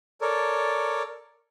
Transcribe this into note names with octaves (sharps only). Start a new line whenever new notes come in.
A4 A#4 C#5 D5